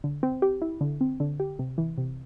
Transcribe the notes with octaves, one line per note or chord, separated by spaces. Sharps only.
D3
C4
G4
E4
D3
C4
D3
G4
C3
E3
C3